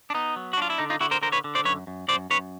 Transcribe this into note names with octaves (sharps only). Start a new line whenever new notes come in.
D4
B3 D#4
F#3
F#4
D4 F4
E4
D3 D#4
D#4 F4
D3 E4 F#4
A#4 C5
D3 A#4 C5
B4 C#5
D3
C5 D5
F#2 B4 C#5
F#2
F#2 C5 D5
F#2 B4 C#5